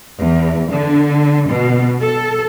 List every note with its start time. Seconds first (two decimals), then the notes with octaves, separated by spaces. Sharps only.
0.18 E2
0.70 D3
1.48 B2
2.02 A4